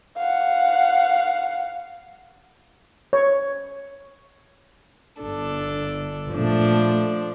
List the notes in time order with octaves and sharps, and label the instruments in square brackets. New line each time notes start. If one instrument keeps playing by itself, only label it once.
[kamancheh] F5 F#5
[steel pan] C#5
[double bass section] G1 [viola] D4 A4
[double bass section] A#2 A3 [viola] F3 D4